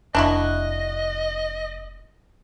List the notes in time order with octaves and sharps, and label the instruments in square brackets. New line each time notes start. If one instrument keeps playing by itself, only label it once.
[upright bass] F1 [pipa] D4 E4 F#4 [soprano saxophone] D#5